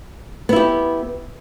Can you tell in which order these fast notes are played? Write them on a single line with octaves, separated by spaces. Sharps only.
B3 E4 G4